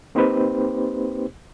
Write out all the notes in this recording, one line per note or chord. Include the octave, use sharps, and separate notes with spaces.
A#3 C4 D#4 G4 B4 C5